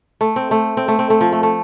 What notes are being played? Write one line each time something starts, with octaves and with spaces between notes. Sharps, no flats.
A3
C4
A3
C4
A3
C4
A3
F3
A3
A3